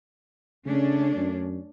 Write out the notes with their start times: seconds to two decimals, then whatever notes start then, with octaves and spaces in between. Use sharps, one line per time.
0.66 C#3 A3 C#4 D4
1.16 F#2